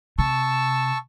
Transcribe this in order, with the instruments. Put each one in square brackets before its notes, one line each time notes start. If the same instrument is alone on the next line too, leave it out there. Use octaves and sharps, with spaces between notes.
[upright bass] C3 [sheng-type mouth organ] A5 C#6 E6